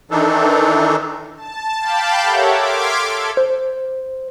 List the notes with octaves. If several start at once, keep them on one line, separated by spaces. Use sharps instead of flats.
D#3 E3 D4 D#4 A4
A5
F5 G5 A5 B5 D6 G6
G4 A4 A#4 C#5 E5 F#5
C6 D6 F6 G#6 B6 D7
A4
C5